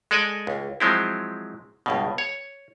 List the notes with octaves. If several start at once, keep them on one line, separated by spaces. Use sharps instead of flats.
G#3 A4 D5 D#5 G#5
C#2
F3 F#3 G#3 C4 E4
C#2 G2 B2
C#5